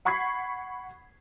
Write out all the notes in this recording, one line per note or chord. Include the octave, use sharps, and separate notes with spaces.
F#5 B5 C#6 G#6 B6 C7